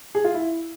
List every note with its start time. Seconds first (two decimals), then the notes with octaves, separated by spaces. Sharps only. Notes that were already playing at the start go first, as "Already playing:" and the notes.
0.15 G#4
0.24 F4
0.34 E4